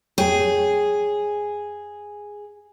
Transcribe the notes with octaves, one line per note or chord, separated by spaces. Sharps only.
F2 G#4 C#5 G5